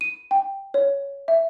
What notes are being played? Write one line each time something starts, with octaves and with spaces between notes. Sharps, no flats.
D#7
G5
C#5
E5